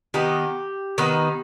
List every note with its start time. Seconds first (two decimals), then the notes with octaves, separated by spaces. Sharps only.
0.14 D#3 B3 D#4 G4
0.98 D#3 B3 D#4